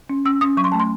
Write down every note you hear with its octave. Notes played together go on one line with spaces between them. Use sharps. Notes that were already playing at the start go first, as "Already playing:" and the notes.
C#4
C#4 E6
C#4 D#6
F#3 C#6
C6
A3 A5
C6